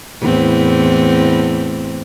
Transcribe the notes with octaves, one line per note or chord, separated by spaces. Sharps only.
E2 A2 C4